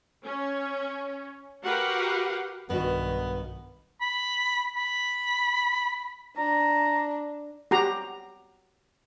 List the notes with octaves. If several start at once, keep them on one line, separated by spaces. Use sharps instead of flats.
C#4
F#4 G4 A#4 B4 F5 F#5
B1 G2 D#3 B3 F#4
B5
B5
D4 A#5
F#4 G4 A#5